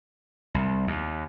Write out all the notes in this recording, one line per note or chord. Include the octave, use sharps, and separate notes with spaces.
C2
D#2